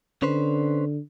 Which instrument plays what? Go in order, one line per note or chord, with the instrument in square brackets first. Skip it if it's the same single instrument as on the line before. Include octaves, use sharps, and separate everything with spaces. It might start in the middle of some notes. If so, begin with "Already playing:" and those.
[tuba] D3 [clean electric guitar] C#4 B4 C5